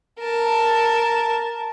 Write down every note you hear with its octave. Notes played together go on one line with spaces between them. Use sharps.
A#4 A5